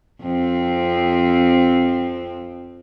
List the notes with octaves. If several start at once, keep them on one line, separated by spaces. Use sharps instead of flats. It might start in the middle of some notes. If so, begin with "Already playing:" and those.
F2 C4